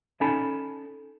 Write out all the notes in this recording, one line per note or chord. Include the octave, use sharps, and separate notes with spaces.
C#4 D#4 A4 G#5 A5 B5